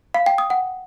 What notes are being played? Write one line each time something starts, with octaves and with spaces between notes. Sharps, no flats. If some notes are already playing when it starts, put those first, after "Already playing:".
F5
G5
D#6
F#5